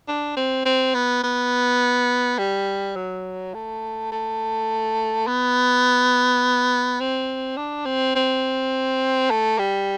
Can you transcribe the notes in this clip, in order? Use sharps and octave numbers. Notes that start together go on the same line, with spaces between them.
D4
C4
C4
B3
B3
G3
F#3
A3
A3
B3
C4
D4
C4
C4
A3
G3